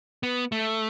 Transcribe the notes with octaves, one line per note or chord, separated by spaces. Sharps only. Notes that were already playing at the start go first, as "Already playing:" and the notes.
B3
A3